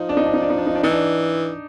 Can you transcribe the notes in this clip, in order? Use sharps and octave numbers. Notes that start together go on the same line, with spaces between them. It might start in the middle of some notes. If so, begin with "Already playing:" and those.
Already playing: F3 D#4
D4
D#4
D4
D#4
D4
D#4
D4
D#4
D4
E3 D#4
D4